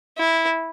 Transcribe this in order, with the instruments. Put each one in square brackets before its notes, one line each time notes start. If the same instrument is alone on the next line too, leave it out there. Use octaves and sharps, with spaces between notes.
[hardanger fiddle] E4